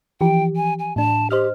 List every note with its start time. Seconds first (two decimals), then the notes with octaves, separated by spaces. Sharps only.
0.21 E3 F3 G4 G5
0.56 G#5
0.79 G#5
0.96 A2 D4 A5
1.31 G4 C5 D#5 F6